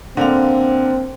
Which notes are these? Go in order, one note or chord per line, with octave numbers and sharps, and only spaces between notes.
D3 A#3 C4 F7